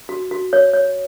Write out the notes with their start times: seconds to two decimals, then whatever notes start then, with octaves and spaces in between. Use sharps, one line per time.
0.09 F#4
0.31 F#4
0.53 C#5
0.74 C#5